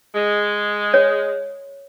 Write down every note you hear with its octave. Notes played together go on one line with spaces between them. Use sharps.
G#3
C#5